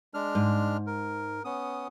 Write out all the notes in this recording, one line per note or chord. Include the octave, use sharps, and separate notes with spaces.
G#3 D4 F6
G#2
A#4
B3 C#4 D#6